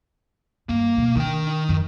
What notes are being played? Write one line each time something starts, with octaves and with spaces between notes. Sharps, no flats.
G2 A#3
F1 B2
D#3 D4 G5
F#2